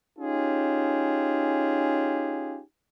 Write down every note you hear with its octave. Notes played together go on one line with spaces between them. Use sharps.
C#4 D#4 F4 G4 G#4